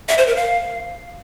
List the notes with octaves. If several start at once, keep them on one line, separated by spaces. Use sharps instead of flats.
E5
C5
A#4
F5